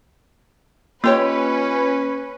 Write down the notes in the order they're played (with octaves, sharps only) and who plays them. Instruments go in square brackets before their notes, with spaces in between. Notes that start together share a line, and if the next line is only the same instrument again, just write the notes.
[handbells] A#3 [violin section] C#4 B4 [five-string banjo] F4 G4 C#5